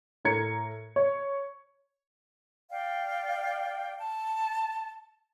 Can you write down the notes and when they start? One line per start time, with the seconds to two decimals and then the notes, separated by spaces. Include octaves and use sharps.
0.25 A2 A#4 A#5 G#6 C#7
0.96 C#5
2.70 D5 F5 G5
4.00 A5